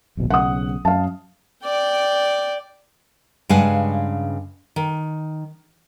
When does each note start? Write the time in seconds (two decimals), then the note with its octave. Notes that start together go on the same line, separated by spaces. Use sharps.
0.17 D1 A#1 B2
0.30 B1 C#3 F#5 D#6
0.85 F#2 F5 A5
1.64 D5 G5
3.49 G2 C#3 G#3 F5 F#5 G#5
4.76 D#3